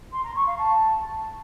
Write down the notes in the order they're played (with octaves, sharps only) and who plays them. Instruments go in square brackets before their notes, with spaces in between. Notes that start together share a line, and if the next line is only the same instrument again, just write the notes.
[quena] C6
A#5
C#6
F5
A5